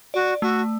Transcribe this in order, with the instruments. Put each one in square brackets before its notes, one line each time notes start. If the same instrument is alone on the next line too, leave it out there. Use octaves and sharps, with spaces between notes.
[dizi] F#4 [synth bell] D5
[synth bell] A3 [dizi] F#4